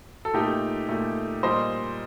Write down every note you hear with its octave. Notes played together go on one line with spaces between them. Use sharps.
A4
A#2 A3 D#4 G4
A#2 A3
A#2 G3 C5 D#5